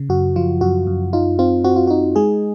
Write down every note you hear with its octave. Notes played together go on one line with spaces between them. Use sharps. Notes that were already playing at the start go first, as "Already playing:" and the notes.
Already playing: C#3
F#2 F#4
F3 F4
F#2 F#4
F#2
D#4 F4
C4 F4
C4 F#4
F4
D#4 F#4
G#3 G#4